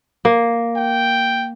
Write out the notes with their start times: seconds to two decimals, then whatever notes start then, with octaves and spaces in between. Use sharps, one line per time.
0.25 A#3
0.77 G5